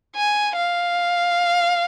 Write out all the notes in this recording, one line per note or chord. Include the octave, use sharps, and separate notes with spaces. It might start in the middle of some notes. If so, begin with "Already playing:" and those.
G#5
F5